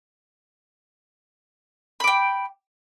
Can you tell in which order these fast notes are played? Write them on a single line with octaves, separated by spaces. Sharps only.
B5 D6 G5